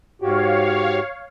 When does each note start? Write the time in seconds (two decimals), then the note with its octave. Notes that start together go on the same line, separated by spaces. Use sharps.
0.22 G#2 F#4 G4 C#5 F5